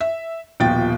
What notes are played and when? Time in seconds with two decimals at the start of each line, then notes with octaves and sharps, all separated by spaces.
0.01 E5
0.60 D#1 B2 F3 G5 A6